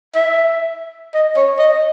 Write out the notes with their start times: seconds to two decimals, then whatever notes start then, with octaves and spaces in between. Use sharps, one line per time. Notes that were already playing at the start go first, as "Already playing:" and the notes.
0.15 E5
1.14 D#5
1.37 C#5
1.59 D#5
1.72 D#5